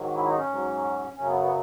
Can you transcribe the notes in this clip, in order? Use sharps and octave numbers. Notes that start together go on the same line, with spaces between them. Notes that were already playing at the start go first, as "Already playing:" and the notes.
Already playing: G#2 D#3 F#3
E4
D#4
C#4
G#2 F#3
F#2 C#3 F#3 C#4
B3
B3